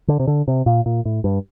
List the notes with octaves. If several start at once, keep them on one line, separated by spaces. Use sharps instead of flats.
D3
C3
D3
C3
A#2
A#2
A2
G2